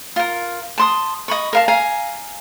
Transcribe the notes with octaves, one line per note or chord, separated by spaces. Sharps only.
F4 A#4
A5 C6 D#6
D#5 B5 C#6
A#4 F5 A5
F5 G#5 A#5